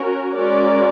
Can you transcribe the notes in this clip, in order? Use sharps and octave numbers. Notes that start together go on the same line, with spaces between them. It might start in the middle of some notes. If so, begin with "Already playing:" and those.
Already playing: C#4 F#4 A#4
G#3 C#4 F#4 A#4 D5